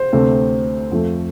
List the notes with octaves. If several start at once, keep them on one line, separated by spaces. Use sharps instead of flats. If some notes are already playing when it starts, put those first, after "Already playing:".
Already playing: C5
D2 C3 A3 C4
F2 F3 A3